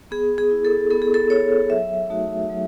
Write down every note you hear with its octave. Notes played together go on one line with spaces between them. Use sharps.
B3 G#4
G#4
E4
A4
B3 A4
G#4
A4
E4 C#5
F#3 E5
A3 D#4 F#4
F#3